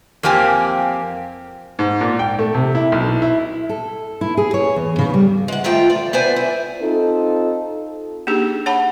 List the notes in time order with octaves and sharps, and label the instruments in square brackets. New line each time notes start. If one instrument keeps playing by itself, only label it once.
[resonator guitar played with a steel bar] F2 A#3 C4 G4 G#5
[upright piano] G#2
A#2
G5
A3
C3
E4
B1
E4
[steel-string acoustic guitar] A4
E4
G#4
C#5
E2
C#3
G3
G#3 F#5
D#3 F3 A3 F4 G5
D5
B3 C5 D5 G#5
E4
[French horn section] C4 D#4 F4 A4
[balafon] A#3 D4 D#4 G4 G#4
C#5 F#5 A5 B5